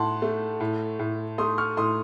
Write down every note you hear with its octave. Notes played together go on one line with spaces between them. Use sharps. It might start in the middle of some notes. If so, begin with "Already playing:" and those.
Already playing: A2 F#5 A5 C6
A3
A2
A2
A3 C6 D#6
C#6 F6
A2 C6 D#6